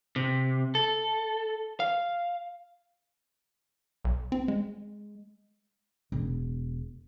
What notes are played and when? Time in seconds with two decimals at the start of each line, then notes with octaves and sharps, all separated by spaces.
0.16 C3
0.75 A4
1.80 F5
4.05 B1
4.32 C4
4.48 G#3
6.12 E1